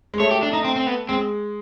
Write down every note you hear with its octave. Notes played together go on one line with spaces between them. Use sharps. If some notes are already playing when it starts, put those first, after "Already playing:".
G#3
A3 C#5
G4
D4
D#4
C4
C4
B3
G#3 C4